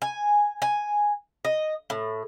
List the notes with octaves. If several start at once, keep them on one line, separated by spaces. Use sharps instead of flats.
G#5
G#5
D#5
A2